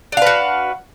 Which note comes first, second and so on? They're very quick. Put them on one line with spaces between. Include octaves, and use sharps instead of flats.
D4 F5 B4 F#4